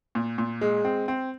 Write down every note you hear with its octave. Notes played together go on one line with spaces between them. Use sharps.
A#2
A#2
G#3
C4
C4